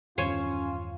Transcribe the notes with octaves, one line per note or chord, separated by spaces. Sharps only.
E2 G2 D#3 C#4 F4 C5 C#5 G#5